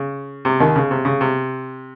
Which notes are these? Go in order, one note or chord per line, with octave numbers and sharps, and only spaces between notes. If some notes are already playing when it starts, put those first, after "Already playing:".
Already playing: C#3
C3
D#2 D#3
C#3
C3
C#3
C3